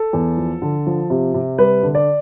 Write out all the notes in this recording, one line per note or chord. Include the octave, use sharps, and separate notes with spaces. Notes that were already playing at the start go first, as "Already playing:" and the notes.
Already playing: A4
E2
F3
D3
F3
C3
C3
G3 B4
D3
D5